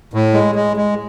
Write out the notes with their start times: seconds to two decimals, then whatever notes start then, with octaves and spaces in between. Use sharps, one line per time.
0.13 A2
0.34 G#3
0.55 G#3
0.77 G#3